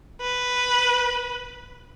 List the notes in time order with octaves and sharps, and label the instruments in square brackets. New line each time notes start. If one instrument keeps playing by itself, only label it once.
[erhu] B4